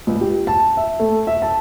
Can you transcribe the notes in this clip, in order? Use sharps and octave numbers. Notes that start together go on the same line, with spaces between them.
C#2
G4
A5
E5
A3
E5
A5